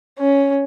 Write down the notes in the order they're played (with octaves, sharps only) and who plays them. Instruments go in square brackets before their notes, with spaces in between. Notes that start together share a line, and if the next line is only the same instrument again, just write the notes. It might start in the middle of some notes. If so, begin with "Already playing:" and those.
[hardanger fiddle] C#4